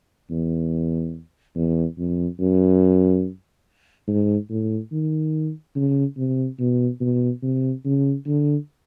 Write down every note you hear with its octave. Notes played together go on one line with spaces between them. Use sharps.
E2
E2
F2
F#2
G#2
A2
D#3
C#3
C3
B2
B2
C3
C#3
D3